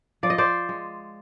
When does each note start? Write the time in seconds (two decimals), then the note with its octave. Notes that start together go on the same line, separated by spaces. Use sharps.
0.23 F3 D5
0.30 D#5
0.38 C5 D5
0.69 G#3